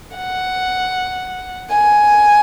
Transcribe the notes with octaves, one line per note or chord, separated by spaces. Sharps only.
F#5
G#5